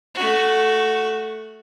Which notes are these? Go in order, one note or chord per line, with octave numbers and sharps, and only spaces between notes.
A3 F#4